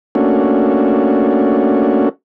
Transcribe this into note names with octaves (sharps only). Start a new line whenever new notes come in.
A3 A#3 C#4 D4 F#4